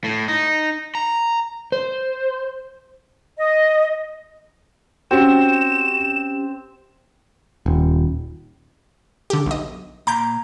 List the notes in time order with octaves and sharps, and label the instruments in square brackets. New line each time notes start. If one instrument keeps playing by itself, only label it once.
[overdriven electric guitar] A2
D#4
A#5
[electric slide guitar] C5
[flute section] D#5
[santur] C4 [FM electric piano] C#4 G4 [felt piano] F#4 [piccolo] E7
[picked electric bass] D#1
[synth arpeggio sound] D3 G4
B1 D#5
[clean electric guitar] A#2 A#5 [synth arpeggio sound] D6 G6